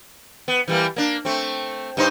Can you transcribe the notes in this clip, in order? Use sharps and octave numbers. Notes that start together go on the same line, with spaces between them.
B3
E3 G3 A#3
A#3 D4
A3 C4
G2 D#4 C5